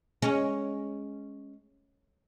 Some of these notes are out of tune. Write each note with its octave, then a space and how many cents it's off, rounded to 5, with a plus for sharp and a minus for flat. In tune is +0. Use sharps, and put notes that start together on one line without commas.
G#3 +0 C#4 +0